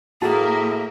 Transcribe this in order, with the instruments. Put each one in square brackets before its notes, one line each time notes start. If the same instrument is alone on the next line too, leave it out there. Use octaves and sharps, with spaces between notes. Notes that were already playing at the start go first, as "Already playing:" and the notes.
[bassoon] A2 [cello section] A#3 A#4 E5 [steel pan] F#4 A5 [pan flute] G#4